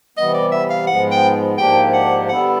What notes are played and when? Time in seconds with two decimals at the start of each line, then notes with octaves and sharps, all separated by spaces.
0.17 C3 E3 G3 B3 D#5
0.34 D5
0.52 E5
0.70 F5
0.87 G#2 F3 G#3 B3 F#5
1.12 G5
1.58 G#2 F3 A#3 D4 G4 G5
1.94 F#5
2.29 D3 G3 B3 E4 F#5